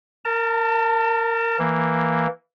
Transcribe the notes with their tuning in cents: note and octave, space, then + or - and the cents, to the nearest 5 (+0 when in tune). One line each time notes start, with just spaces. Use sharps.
A#4 -15 A5 +30
E3 +0 A#3 +0